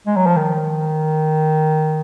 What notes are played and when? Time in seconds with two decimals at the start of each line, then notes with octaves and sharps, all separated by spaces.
0.07 G#3
0.16 F#3
0.26 F3
0.36 D#3